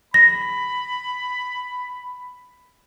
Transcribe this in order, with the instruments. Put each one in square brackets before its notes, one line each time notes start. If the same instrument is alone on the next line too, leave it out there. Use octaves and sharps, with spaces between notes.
[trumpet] B5 [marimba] A#6